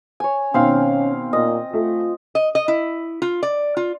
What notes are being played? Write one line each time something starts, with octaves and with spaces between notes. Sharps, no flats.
C#5 G#5
B2 D#3 C4 C#4 F5
A#2 D#5
A3 F4
D#5
D#5
E4
F4
D5
F4